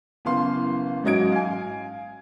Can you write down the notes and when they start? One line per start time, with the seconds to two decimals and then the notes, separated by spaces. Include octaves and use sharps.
0.25 F#1 E3 B3 F5 C6
1.03 A1 G#2 F#3 D#5 G#6 D7
1.32 F5 G#5